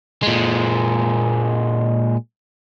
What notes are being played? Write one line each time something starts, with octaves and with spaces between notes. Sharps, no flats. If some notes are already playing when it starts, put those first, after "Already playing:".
A#2 G#3